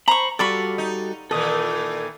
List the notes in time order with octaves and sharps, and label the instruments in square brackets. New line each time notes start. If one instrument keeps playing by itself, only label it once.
[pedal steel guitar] C5 B5 [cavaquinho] A#5 C#6
[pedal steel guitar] G3 F#4 A4 [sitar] F4 [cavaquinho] D5 B5 C#6
[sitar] D#4
[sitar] A#2 D#3 E3 [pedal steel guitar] A4 D#6